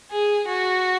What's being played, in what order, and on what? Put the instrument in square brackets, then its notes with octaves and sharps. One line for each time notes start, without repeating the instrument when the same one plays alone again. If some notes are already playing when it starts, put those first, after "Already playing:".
[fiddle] G#4
F#4